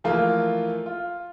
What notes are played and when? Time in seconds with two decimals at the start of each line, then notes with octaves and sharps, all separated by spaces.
0.04 E3 F3 A3 A#3 F4
0.86 F4